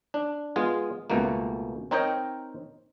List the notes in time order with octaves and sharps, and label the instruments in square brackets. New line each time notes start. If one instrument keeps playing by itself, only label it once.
[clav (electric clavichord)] D4
G#3 B3 F4 G#4
C#2 B2 A3 A#3
C4 D#4 A#4 C#5 D#5 G5